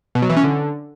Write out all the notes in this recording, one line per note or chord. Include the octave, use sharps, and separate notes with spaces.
B2
F#3
E3
C#4
D3